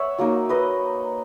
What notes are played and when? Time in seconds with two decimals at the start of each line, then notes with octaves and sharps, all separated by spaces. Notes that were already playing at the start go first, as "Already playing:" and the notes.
Already playing: C#5 E5 F#5
0.18 F#3 A#3 D#4
0.49 B4 D#5